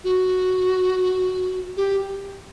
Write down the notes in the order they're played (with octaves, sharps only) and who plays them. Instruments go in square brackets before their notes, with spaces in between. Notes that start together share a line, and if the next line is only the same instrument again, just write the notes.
[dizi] F#4
G4